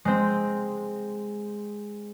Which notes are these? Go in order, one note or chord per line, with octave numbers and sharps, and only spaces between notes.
G#3 C4